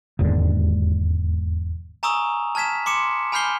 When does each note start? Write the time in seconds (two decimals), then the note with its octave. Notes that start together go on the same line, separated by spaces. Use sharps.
0.19 E1 D#2 G#2 D3
2.03 G#5 A#5 C#6 D#6 E6 F7
2.55 A5 F6 G#6 B6 E7
2.86 C6 D6 C#7 E7
3.32 G#5 B5 F6 G6 C7 G7